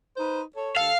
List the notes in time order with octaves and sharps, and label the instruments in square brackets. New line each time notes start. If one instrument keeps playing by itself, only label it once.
[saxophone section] D#4 B4 C5
A4 C#5
[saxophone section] D#2 A4 [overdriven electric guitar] F5